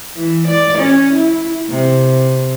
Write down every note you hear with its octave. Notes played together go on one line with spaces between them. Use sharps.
E3
D5
C#4
E4
C3